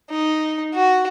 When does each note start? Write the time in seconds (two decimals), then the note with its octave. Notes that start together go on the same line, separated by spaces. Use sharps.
0.11 D#4
0.74 F#4